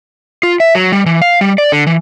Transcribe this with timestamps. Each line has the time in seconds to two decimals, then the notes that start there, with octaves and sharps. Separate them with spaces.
0.43 F4
0.60 E5
0.75 F#3
0.92 G3
1.06 E3
1.22 F5
1.41 G3
1.58 D5
1.72 D3
1.87 E3